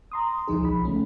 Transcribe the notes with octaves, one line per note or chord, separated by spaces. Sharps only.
A#5 C6 D#6
C#2 F3 D#4 G#4
B1 F3 B5
C#3 A3 C#4